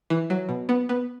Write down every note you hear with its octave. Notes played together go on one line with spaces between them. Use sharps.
E3
F#3
B2
B3
B3